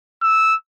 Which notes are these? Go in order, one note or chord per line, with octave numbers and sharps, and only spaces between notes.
E6